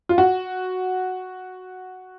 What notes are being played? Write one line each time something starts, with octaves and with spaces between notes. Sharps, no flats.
F4
F#4